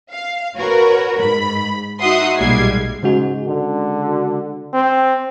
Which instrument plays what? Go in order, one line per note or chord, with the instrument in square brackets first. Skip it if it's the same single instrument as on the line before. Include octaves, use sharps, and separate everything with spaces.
[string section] F5
F#4 A#4 B4 C#5
G#2 B5
D#4 F#4 E5 F#5 C6 D#6
B1 A#2 G3 G#3 G#6 C7
[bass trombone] G#2 [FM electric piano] C#3 G#3 F#4
[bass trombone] D3
C4